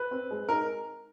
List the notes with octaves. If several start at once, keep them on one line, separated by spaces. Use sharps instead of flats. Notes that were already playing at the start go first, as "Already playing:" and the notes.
Already playing: B4
C4
G#3
D#4 A#4